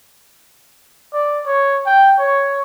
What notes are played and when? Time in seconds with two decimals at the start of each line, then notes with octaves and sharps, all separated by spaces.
1.14 D5
1.47 C#5
1.86 G5
2.19 C#5